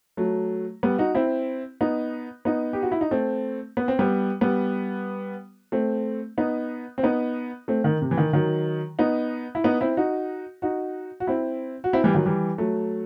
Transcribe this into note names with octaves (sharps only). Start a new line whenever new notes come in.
F#3 A3
G3 B3
D#4 F#4
C4 E4
B3 D#4
B3 D#4
G4
F#4
E4
D#4
A3 C4
B3
C4
G3 B3
G3 B3
A3 C4
B3 D#4
C4
B3 D#4
A3 C4
D#3
C3
E3
D#3
D#3 F#3
B3 D#4
E4
B3 D#4
C4 E4
D#4 F#4
D#4 F#4
F#4
C4 E4
F#4
C4 E4
E3 G3
D#3 F#3
E3 G3
F#3 A3